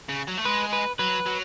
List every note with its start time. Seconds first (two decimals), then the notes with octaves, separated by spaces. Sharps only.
0.09 C#3
0.28 F#3
0.38 A3
0.45 G#3 B4
0.73 B4
0.99 F#3 B4
1.26 F#3